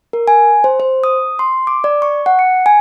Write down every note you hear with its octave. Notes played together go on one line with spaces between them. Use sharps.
A#4
G#5
C5
C5
D#6
C6
D6
D5
C#6
F#5
C#7
G#5